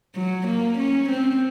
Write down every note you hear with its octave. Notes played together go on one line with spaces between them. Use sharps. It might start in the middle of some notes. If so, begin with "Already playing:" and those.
F#3
A#3
C#4
C4